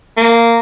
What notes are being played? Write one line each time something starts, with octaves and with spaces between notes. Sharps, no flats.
A#3